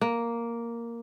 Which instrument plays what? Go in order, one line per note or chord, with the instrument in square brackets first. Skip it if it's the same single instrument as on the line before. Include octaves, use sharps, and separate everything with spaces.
[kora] A#3